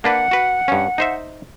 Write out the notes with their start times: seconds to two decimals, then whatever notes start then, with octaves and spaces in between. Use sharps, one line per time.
0.04 A#3 D4 B4 F#5
0.31 F#4 B4
0.68 G2 C#4
0.98 D#4 C5 E5